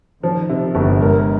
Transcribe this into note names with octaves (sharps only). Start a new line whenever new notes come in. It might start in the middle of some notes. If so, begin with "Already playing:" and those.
D#3 F3
C3
G1
G#3 A#4